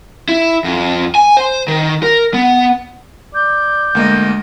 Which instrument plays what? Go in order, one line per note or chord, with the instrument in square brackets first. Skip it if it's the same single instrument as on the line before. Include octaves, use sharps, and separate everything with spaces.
[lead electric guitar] E4
F2
G#5
C5
D#3
A#4
B3
[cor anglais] D5 [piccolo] G6
[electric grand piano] D2 A#3 [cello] G#3 D#5